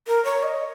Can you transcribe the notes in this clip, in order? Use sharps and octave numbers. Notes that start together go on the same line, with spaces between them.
A#4
C#5
D#5